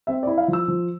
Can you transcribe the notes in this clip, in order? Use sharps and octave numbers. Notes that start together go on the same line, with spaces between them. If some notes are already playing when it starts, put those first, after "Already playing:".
C4 E5
D5
E4
F5
F3
E6
F3